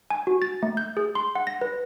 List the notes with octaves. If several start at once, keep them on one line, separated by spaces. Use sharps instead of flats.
G#5
F#4
A6
A3
G6
G#4
C6
F#5
A#6
B4